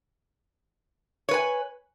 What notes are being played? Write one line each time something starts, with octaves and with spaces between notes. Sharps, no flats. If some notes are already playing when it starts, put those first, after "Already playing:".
B4 C#5 G#5